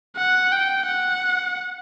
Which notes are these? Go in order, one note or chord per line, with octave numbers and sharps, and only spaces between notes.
F#5
G5
F#5